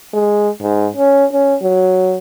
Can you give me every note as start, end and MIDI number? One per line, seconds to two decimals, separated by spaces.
0.13 0.49 56
0.61 0.87 44
0.97 1.25 61
1.32 1.55 61
1.62 2.18 54